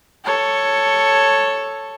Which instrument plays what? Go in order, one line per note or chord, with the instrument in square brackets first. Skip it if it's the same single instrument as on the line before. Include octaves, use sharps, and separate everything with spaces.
[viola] A4 C#5